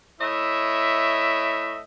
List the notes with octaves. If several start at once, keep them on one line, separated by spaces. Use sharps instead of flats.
A3 E4 C#5 D#5 E5